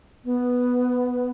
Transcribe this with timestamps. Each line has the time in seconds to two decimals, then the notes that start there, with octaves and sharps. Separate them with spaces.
0.25 B3